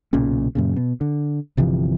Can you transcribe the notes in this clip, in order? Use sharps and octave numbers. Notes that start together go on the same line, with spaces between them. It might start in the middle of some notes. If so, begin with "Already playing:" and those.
B1 A#2 C#3 C#4
F#2 A#2 C#3
B2
D3
G1 C3 E3 F3